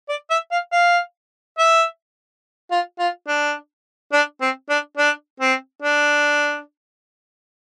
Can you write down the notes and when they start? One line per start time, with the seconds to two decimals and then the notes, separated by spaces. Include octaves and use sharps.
0.09 D5
0.30 E5
0.52 F5
0.72 F5
1.58 E5
2.71 F4
2.99 F4
3.28 D4
4.13 D4
4.41 C4
4.69 D4
4.97 D4
5.40 C4
5.82 D4